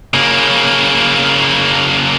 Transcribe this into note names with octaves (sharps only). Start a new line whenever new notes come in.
C#3 A#3